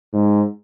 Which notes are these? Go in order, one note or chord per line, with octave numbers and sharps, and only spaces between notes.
G#2